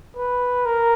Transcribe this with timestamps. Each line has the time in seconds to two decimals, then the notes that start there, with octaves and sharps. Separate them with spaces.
0.16 B4
0.65 A#4